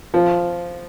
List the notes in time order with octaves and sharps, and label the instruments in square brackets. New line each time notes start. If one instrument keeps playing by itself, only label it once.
[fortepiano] F3